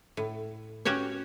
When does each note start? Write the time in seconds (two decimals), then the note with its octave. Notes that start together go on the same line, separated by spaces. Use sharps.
0.17 A2
0.85 C#4 F#4 G4 C#5